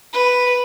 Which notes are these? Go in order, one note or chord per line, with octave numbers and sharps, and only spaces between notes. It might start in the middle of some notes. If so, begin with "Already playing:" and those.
B4